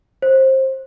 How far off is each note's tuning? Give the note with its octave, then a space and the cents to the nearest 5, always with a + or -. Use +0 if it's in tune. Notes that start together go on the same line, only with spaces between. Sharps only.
C5 +20